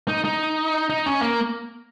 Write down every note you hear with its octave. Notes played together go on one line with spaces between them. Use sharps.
D#4
D#4
D#4
C#4
A#3